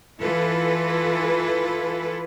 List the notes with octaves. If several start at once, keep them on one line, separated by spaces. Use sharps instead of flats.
E3 E4 F4 A4 B4